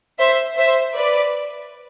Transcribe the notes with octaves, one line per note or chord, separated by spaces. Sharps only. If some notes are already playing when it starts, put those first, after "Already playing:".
C5 E5
C5 E5
B4 D5